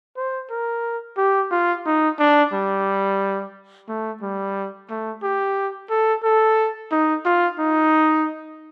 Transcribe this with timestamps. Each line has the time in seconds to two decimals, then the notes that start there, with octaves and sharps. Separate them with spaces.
0.17 C5
0.50 A#4
1.17 G4
1.51 F4
1.86 D#4
2.19 D4
2.53 G3
3.89 A3
4.22 G3
4.90 A3
5.23 G4
5.90 A4
6.24 A4
6.92 D#4
7.25 F4
7.59 D#4